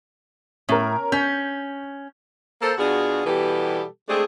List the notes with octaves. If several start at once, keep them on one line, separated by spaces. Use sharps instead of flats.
A2 C#4 A#4
C#4 G6
A#3 A4 C5
B2 D4 F4 F#4 G#4
B2 E3 G3 B3 G4 A4
G#3 A3 C4 D4 G#4